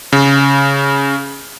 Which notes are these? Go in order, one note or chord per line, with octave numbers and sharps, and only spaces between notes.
C#3